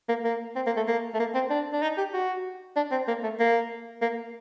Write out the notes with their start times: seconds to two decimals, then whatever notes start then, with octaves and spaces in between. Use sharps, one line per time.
0.09 A#3
0.25 A#3
0.56 C4
0.67 A#3
0.77 A3
0.88 A#3
1.14 A3
1.20 A#3
1.35 C4
1.50 D4
1.73 D4
1.82 D#4
1.98 G4
2.14 F#4
2.77 D4
2.91 C4
3.08 A#3
3.23 A3
3.40 A#3
4.02 A#3